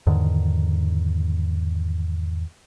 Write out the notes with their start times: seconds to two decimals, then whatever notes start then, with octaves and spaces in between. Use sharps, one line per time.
0.07 E2 G#2 D3 D#3